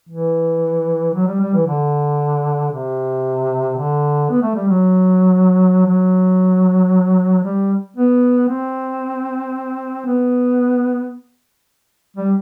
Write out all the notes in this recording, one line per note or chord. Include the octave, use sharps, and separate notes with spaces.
E3
F#3
G3
G3
E3
D3
C3
D3
B3
A3
G3
F#3
F#3
G3
B3
C4
B3
G3